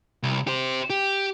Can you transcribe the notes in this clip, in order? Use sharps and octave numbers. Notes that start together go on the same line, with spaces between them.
C2
G4 C5
G4